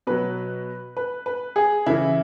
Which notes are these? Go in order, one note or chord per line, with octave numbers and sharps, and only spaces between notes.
B2 F#3 B4
B4
B4
G#4
C#3 E3 E4